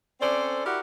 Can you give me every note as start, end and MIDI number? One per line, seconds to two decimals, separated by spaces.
0.20 0.61 60
0.20 0.61 61
0.20 0.61 69
0.20 0.61 72
0.20 0.61 74
0.65 0.80 64
0.65 0.80 66
0.65 0.80 67
0.65 0.80 70
0.65 0.80 74
0.65 0.80 78